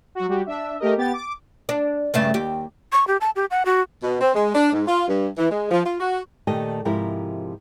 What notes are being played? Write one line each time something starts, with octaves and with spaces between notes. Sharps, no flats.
F#3 F#4
G3 F#4 G4
D4 E5
A3 G4 A#4 D#5
B3 G4 A6
D6
D4
G2 C#3 A3
D#2 G4
C#6
G4
A5
G4
F#5
F#4
B2
C4
G#3
D4
G#2
F4
G2
E3
G#3
F3
F4
F#4
A#2 D#3 A3 G4 D#5 A5
G#2 C3 F3 E4 G4 A#4